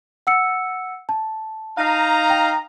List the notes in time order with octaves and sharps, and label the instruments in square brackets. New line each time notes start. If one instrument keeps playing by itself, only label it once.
[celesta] F#5 E6 C#7
A5
[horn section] D#4 F5 A#5
[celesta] G5